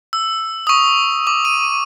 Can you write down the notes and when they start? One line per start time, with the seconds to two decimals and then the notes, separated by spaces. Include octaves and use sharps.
0.13 E6
0.67 C#6 D#6
1.27 D6
1.45 D#7